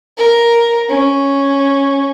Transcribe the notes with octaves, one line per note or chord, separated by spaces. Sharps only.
A#4
C#4